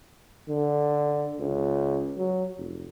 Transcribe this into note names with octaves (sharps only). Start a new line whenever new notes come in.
D3
C#2
F#3
F1